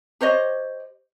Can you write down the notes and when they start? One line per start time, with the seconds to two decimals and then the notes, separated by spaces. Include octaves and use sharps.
0.21 G4 C5 C#5 D#5